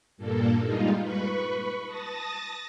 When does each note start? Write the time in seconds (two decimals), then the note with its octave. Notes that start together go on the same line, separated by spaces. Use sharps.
0.17 G2 A#2 A#3 A4
0.62 G3 G#3 D#4 F4
1.02 B4 B5 C#6
1.86 A5 D#6 A6 A#6